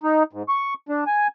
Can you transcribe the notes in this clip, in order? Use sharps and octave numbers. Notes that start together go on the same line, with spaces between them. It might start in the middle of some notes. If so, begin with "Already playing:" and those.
D#4
G#2
C#6
D4
G#5